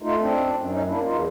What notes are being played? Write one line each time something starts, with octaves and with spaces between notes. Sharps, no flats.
A3 D#4 F4
C4 D4
F#2
F#2
D4
C#4 D#4
A#3 D4 E4
E2 D#4 F4